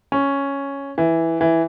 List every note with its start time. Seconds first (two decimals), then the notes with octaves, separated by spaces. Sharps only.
0.12 C#4
0.98 E3
1.41 E3